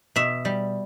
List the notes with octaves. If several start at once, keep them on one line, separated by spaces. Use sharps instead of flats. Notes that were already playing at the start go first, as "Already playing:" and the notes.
B2 E5
G3